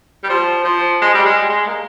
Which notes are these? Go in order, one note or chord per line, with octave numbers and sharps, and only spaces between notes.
G3
F3
F3
G#3
G3
G#3
G#3
A#3